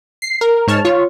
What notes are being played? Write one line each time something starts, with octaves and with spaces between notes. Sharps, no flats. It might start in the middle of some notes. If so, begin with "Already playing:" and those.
C7
A#4
G#2 C#5 A5 F6
F4 C#5